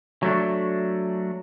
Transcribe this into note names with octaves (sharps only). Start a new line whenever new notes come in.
F#3 A3 D4